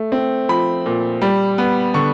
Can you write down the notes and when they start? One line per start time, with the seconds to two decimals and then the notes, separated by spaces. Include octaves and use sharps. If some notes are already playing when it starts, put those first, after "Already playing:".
Already playing: A3
0.12 C4
0.49 F3 B5
0.86 A#2
1.22 G3
1.58 B3
1.94 D3 C#6